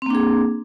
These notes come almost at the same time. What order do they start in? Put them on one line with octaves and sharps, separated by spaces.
C4 A#3 D4 G#4